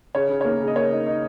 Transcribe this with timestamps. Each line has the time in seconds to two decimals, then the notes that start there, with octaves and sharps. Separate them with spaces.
0.14 C#3 C#5
0.29 C#3
0.41 C#5
0.45 A#3 A#4
0.60 C#3
0.68 D#5
0.75 A#3 C#5
0.91 D#4
1.07 D#4